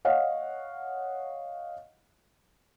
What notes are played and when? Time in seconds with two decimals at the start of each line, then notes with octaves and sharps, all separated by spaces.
0.05 C#5 D#5 F5 F#5